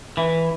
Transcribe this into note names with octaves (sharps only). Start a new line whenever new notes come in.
E3